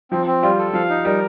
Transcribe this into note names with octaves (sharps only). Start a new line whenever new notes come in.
F3 C4
C4
G3 F4
A4
F3 F5
D#4
G3 A#4